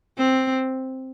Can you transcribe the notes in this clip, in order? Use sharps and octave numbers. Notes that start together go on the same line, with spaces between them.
C4